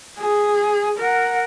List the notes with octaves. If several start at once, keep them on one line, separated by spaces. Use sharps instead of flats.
G#4
A#4 F#5